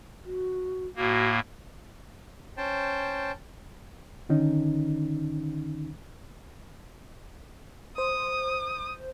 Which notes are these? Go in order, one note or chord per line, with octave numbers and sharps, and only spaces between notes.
F#4
A2 A#3 F#4
C#4 C5 G5 A5
D3 D#3 C#4 D#4
C5 D#6